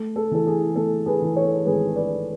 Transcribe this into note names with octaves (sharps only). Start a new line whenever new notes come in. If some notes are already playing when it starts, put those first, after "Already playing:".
Already playing: A3
A4
E3 A4
G#4
A3 A4
G#4 B4
E3
A4 C#5
G#1 G#4 B4
B4 D5